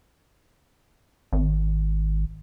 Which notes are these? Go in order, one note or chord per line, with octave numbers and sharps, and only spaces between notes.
G#1